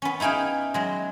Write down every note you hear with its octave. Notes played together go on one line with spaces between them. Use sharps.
B3 C#4
D#4 E4 G#4 F5 G5
F#3 G#3